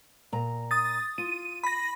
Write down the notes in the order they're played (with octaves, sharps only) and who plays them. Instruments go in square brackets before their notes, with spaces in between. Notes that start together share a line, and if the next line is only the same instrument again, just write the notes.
[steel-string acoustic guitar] A#2 A#5
[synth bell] D#6 A6
[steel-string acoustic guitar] F4 [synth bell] D#7
[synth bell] B5 A#6